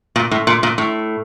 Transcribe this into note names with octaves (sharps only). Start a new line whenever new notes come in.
A#2
A2
A#2
A#2
A2